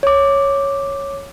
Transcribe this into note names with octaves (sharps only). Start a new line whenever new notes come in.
C#5 D6